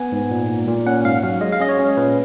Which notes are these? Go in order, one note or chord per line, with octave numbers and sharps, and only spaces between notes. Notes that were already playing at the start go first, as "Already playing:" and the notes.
Already playing: B3 G#5
G#2
A#2
A#2
A#2
C#4 F#5
G#2 F5
F#3 F5
G#3 D#5
F5
C#4 D#5
C#5
C#4
A#2 B4